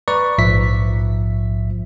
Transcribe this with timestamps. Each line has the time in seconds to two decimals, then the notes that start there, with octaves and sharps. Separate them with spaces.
0.08 B4 D5 A#5 C#6
0.38 A#1 G#2 F3 E5 B6